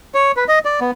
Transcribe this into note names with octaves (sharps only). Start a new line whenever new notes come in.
C#5
B4
D#5
D5
B3